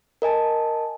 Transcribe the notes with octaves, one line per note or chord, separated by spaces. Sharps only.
A#4 D#5 G#5 A5